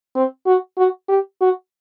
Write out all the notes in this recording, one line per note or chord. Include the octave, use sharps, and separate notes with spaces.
C4
F#4
F#4
G4
F#4